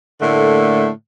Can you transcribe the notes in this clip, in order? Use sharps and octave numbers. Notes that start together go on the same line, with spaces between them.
A2 D3 A3 A#3